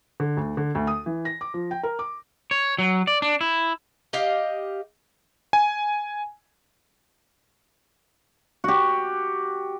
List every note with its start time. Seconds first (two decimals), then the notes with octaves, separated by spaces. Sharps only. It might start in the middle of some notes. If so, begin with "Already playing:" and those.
0.20 D3
0.37 D2
0.57 D3
0.75 D2
0.87 D#6
1.06 E3
1.25 A#6
1.41 D6
1.54 F3
1.71 G5
1.83 A#4
1.99 D6
2.51 C#5
2.78 F#3
3.07 D5
3.22 D4
3.41 E4
4.13 G4 D#5 F5
5.53 G#5
8.64 F#4 G4